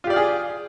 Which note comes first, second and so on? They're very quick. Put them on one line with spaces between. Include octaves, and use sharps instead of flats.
F4 G4 D5 F5 G#4